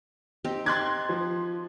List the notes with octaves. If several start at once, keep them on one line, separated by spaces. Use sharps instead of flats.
C4 D#4 G4
D#4 C6 D6 F#6 G#6 A6
F3